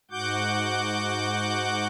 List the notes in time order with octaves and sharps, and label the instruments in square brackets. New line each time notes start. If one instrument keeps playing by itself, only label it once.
[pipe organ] G#2 F#4 F#5 D6 G6